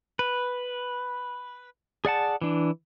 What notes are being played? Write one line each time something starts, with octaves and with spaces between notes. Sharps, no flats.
B4
G#4 D5 F#5 A5
E3 D4